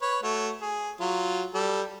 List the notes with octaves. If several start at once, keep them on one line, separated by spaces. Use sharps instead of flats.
B4 C#5
A3 F#4 C#5
G#4
F#3 F4
G3 A4